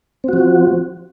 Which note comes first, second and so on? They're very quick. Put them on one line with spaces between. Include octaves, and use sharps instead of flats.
C4 F#4 F3